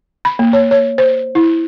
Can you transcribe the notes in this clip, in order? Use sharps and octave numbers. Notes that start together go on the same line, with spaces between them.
B5
A#3
C#5
C#5
C5
E4